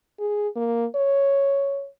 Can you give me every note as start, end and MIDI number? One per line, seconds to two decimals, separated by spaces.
0.19 0.48 68
0.56 0.86 58
0.95 1.88 73